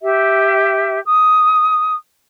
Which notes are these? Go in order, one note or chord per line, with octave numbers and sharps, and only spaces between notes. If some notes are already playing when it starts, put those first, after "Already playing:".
G4 E5
D#6